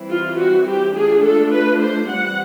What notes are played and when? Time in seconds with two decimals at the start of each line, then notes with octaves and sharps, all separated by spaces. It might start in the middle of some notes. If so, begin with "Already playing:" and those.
Already playing: E3 G3 C4 E4
0.09 F4
0.37 F#4
0.66 G4
0.95 A3 D4 F4 G#4
1.23 A4
1.52 B4
1.81 C5
2.09 E3 G3 C4 F#5